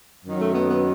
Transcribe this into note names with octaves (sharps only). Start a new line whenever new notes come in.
F#2 D#3 F#3
A3
B3
B3